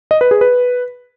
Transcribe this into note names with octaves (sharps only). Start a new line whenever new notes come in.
D#5
B4
G#4
B4